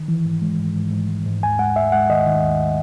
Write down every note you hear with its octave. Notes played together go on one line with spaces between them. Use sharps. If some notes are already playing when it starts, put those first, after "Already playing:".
Already playing: D#3
E3
G#2
G#3
G#2
G#2
G#2
G#2
G#2
D#2 G#5
G#3 F#5
D#2 E5
G#3 F#5
D#3 D#5
D#3
D#2